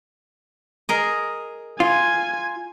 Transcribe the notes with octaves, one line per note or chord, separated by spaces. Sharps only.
G#4 A#4 D#5
F4 G#5